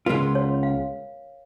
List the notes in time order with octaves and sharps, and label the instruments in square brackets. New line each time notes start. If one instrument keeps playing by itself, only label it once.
[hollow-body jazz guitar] C#2 C#3 G#3 B3 F4 [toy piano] A#4
[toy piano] C#5
F5